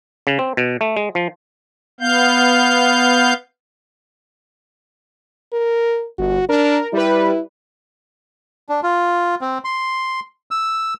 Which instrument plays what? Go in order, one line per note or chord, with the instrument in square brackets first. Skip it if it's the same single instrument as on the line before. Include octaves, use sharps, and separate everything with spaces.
[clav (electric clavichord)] C#3
C4
B2
A3
G#3
F3
[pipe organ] B3 F5 G6
[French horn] A#4
[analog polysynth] G1 [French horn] F#4
[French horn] D4 [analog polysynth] A#4
[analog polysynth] G3 B4 [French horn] E4
[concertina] D4
F4
C4
C6
E6